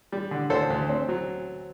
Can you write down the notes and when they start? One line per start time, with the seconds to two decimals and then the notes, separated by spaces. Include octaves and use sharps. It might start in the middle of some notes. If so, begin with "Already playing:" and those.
0.12 G3
0.31 D3
0.50 D2 A4 C5
0.70 D2
0.89 C4
1.09 F#3